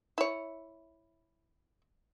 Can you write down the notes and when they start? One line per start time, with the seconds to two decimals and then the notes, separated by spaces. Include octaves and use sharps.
0.18 E4 C#5